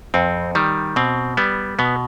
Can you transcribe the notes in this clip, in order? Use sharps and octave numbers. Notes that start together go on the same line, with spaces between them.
F2 C4
D#3 G3
B2 C4
G3 B3
B2 B3